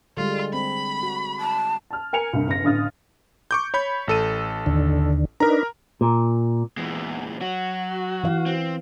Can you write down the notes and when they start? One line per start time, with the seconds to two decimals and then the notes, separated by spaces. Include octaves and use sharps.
0.17 D3 G3 G#3 F4
0.54 C4 B5
1.03 F#4
1.39 A5
1.91 A5 F6
2.13 A#4 G#5 C#7 F7
2.33 C2 G2
2.47 G1 C#3 A#6
2.64 A1 D3 F5 D#6 F6 A6
3.51 C#6 D6 G6
3.74 C#5 B5 G6
4.08 A1 A4 D#7
4.66 D#2 D3
5.40 D4 D#4 A#4 B4 A#5
6.01 A#2
6.77 E2 A#2 E3 G#3
7.41 F#3 F#4
8.24 E3 F5
8.46 C4